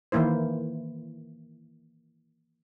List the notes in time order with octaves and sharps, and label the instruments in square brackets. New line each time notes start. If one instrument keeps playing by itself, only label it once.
[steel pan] D#3 E3 A#3 E4 C5